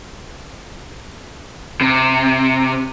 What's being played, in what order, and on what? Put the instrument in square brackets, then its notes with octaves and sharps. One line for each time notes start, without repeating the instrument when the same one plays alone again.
[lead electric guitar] C3